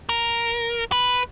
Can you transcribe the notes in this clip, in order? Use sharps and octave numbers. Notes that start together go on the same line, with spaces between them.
A#4
B4